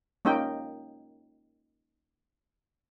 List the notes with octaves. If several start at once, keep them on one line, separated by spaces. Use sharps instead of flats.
A#3 C#4 D#4 G4 G5